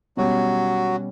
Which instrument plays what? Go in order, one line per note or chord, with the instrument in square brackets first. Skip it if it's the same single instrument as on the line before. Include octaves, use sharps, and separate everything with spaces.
[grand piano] B2 G3 C#4 [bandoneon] F#3 F#4